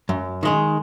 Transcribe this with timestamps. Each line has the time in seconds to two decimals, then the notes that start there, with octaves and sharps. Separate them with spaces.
0.09 F#2
0.43 D#3 G#3 D#4